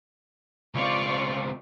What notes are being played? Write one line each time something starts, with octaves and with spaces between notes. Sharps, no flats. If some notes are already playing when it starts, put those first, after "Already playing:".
C#2 C4 F4 D5 C#6